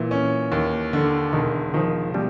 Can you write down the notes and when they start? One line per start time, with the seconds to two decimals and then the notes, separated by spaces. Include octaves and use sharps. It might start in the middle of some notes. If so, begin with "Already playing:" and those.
Already playing: A#2 E3
0.11 C#4
0.52 D#2
0.93 D3
1.33 E1 D#3
1.74 D#3 F3
2.14 B2 G3